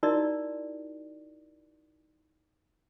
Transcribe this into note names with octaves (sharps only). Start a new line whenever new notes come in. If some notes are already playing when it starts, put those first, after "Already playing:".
D#4 E4 F#4 A#4 D5 D#5